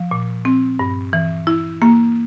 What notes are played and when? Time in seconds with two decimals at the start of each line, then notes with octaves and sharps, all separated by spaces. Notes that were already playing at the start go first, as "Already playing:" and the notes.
Already playing: F3
0.11 A#2
0.45 C4
0.79 G2
1.13 E3
1.47 E4
1.82 A#3